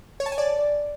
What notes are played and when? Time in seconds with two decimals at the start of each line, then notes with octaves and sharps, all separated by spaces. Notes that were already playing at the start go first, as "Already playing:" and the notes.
0.20 C#5
0.26 A5
0.32 G#5
0.38 D5